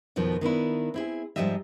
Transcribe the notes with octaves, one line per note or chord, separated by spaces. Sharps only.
F2 B2 D#3 F3 B3
D#3 B3 D4 E4
C4 E4 G#4
G#2 C#3 F3 G3 D#5 E5